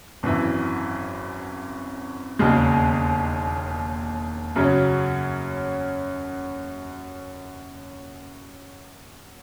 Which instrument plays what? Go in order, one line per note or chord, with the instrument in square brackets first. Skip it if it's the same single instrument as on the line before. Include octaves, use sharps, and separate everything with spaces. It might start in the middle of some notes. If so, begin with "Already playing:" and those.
[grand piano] G#1 F#2 E3
E1 D#2 C#3 G#3
F#2 C#3 F#3 C#4